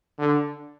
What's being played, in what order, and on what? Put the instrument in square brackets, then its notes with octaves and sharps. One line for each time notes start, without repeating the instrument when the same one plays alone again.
[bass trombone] D3